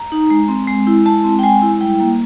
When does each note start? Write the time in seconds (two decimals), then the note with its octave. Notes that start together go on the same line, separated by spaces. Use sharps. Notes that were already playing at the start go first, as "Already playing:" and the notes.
Already playing: A#5
0.12 D#4
0.30 G#3
0.48 C4
0.68 G#3
0.87 E4
1.06 G#3 A5
1.24 C4
1.39 G5
1.43 G#3 G#5
1.62 E4
1.81 G3 G5
2.00 A#3